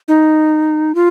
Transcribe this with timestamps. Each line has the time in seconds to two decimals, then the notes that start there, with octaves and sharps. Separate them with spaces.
0.08 D#4
0.95 F4